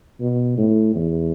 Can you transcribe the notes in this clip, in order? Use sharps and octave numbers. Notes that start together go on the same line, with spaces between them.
B2
A2
E2